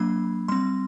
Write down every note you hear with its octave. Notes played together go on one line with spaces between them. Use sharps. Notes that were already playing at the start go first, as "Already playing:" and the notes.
Already playing: F#3 A#3 D4 B5
G3 C4 C6